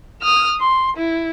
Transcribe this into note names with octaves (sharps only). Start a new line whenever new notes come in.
D#6 F6
C6
E4